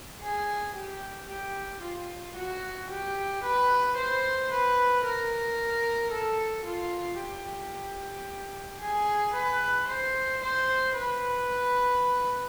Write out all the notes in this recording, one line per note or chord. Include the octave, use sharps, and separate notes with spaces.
G#4
G4
G4
F4
F#4
G4
B4
C5
B4
A#4
A4
F4
G4
G#4
B4
C5
C5
B4